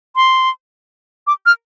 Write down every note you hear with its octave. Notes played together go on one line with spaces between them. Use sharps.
C6
D6
F6